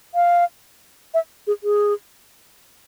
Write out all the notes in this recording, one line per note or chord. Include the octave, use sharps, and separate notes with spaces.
F5
E5
G#4
G#4